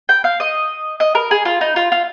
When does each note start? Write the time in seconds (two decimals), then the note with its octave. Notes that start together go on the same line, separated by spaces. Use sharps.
0.09 G5
0.24 F5
0.40 D#5
1.00 D#5
1.15 A#4
1.31 G#4
1.45 F4
1.61 D#4
1.76 F4
1.92 F4